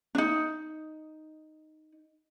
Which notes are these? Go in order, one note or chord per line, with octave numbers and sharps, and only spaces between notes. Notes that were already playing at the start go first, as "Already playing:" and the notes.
D4 D#4